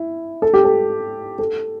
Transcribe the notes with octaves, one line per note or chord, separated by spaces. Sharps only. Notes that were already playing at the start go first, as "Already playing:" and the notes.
Already playing: E4
A4
G4
A4
A4